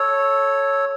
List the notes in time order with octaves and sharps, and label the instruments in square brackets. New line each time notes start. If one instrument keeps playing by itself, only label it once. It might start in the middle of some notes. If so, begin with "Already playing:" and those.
Already playing: [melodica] A4 C#5